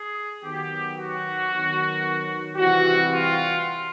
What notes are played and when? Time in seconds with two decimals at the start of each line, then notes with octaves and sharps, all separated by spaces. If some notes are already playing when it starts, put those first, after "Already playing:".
Already playing: G#4
0.43 D#3 F#3 B3 G4
0.96 F#4
1.50 D#3 F#3 B3
2.57 C3 E3 G3 C4 F#4
3.10 F4